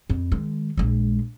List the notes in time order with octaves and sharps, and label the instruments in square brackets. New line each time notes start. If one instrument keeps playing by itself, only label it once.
[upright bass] F2
D#3 G#3
A#1 G#3